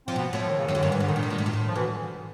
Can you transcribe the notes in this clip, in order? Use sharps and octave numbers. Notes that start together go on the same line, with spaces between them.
F3 C4
B2 B3
A2
F3
D#3
C#3
F#2 D#3
F2 D3
G2 D#3
G#2 E3
G2 D3
A2 D#3
A#2
A2
A#2
A2
A#2
A2
F3
B2 E3